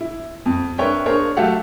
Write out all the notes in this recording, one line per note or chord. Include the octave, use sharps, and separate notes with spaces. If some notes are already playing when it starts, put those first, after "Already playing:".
E4
F2
D4 A#4 B4 C#5 E5 G5
A#3 D4 G#4 A#4 C5 C#5
F#3 A3 G4 A4 F5 F#5